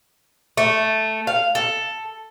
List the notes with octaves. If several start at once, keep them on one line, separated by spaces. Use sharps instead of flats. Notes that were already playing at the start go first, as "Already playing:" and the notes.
A3
F5
A4